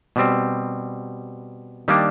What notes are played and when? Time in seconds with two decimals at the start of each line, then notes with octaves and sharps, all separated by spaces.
0.16 B2 G3 C4
1.88 D#3 G3 A#3 D4